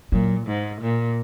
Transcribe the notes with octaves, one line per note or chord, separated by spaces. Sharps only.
A#2 F#3
G#2
A#2